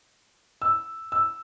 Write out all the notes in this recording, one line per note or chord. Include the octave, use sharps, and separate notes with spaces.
E6
E6